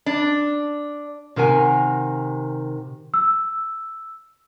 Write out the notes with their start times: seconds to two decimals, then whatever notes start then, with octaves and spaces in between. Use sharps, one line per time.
0.06 D4
1.36 C3 D#3 A#4 F#5 G#5
3.14 E6